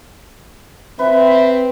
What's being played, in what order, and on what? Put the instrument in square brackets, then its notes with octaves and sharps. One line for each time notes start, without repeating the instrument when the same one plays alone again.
[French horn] C4 [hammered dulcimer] B4 [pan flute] E5